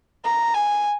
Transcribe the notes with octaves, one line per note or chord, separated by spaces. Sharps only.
A#5
G#5